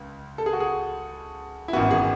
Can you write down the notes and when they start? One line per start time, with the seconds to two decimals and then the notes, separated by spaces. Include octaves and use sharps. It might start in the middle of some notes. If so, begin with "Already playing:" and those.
Already playing: C#2
0.38 A4
0.46 G#4
0.53 F#4
0.60 G#4
1.68 E4
1.73 G#1 F#2 E3 B3 F#4
1.91 G#4